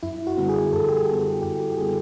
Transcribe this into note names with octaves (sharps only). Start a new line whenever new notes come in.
F#2 E4
F#4
D3 G3 B3
G#4
F#2 A4
G4
G#4
D3 G3 B3
G4
F#2 G4
G4
G4
D3 G3 B3 G#4